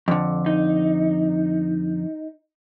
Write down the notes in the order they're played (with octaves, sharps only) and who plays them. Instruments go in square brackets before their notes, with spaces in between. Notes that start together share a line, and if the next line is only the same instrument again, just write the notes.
[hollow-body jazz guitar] F2 D3
[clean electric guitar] D#4